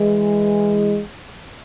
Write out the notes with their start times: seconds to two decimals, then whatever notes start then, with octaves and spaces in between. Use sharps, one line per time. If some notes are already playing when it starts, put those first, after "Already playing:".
Already playing: E3 G#3